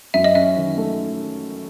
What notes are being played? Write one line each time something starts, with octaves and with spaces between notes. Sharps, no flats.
F#2 E5
D#5
C#4 E5
D#3
A3